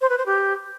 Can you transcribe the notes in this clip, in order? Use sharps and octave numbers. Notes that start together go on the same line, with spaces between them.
C5
B4
C5
G4